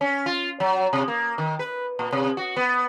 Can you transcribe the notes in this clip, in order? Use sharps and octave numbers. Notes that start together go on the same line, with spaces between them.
C#4
F4
F#3
C3
A#3
D#3
B4
A#2
C3
F#4
B3